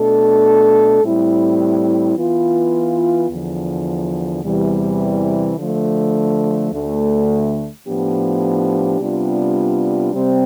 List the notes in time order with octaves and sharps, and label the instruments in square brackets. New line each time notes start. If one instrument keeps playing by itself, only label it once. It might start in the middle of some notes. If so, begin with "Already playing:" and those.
Already playing: [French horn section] B2 A3 D4 A4
A2 G3 C4 E4
E3 B3 F4
E2 D3 F3
E2 C3 E3 G3
D3 F3 A3
D2 D3 A3
A2 F3 B3 D4 G4
C3 G3 B3 D4 F4
C3 G3 C4